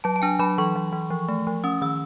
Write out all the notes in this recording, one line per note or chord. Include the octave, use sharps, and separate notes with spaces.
F#3 A5
A5
D4 G#5
F#3 B5
E3 C#6
E3
E3
F3
A3
F3
C#4 D#6
D#3 E6